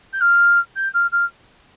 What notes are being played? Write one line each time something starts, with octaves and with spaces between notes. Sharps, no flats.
G6
F6
G6
F6
F6